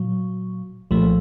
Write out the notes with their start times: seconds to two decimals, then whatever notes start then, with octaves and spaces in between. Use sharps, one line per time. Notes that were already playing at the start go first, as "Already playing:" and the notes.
Already playing: A#2 F#3
0.91 C2 A#2 F3 A3